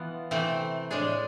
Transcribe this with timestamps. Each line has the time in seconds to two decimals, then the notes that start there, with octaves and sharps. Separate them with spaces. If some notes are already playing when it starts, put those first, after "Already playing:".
Already playing: E3 B3 F4
0.31 C3 E3 A3 C4
0.91 A2 G#3 D4 G#4